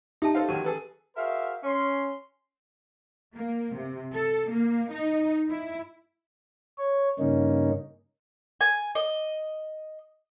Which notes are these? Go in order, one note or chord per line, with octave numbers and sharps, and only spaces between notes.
D#4 G4 E5 A5
A4 C5 F5
A1 D#3 F#3 D#7
G#4 A4 B4
F#4 G#4 A#4 C5 E5 F5
C#4 C6
A#3
C3
A4
A#3
D#4
E4
C#5
G2 C#3 A#3 C#4 D#4
G#5
D#5